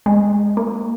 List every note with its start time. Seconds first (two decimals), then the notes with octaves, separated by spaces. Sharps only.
0.06 G#3
0.57 A#3